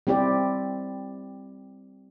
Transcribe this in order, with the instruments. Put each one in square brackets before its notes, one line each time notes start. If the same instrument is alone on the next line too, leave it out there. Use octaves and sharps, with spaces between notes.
[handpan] G3 C4 E4 G4 D5